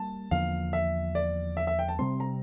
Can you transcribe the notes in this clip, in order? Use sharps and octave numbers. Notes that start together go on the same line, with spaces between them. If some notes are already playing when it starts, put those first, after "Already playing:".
Already playing: G3 A#3 A5
E2 D3 F3 A#3 F5
E5
D5
E5
E5
G5
A5
C3 G3 C4 C6
A#5